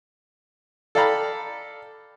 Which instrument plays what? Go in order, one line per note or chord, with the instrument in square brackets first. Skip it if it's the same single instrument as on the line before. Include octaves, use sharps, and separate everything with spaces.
[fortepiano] A4 D5 F5 G5 A#5 B5